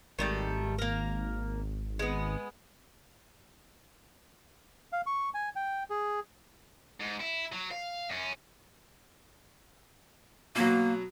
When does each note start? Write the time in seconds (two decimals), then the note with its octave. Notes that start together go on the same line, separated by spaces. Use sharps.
0.19 G#1 D#3 G3 A3
0.78 A#3 A#4
1.99 G#3 B3
4.93 F5
5.06 C#6
5.34 G#5
5.56 G5
5.90 G#4
7.00 G#2
7.20 E4
7.52 F#3
7.71 F5
8.10 F#2 C#4
10.56 B2 F#3 A#3